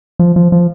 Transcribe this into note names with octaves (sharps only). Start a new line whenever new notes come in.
F3
F3
F3